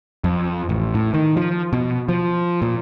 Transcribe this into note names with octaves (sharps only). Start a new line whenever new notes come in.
F2
A1
A2
D#3
F3
B2
F3
A#2